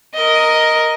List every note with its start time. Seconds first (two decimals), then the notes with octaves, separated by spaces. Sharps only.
0.14 A#4 D#5